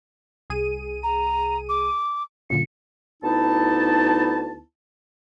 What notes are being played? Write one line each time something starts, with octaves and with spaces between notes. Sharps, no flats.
C2 G#4 D#7
A#5
D6
F#2 A#2 D3 C#7
D2 B3 D#4 E4 A5